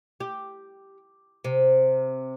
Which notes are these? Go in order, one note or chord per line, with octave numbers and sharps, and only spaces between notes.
G4
C3